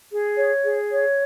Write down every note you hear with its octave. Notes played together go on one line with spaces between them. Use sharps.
G#4
C#5
G#4
C#5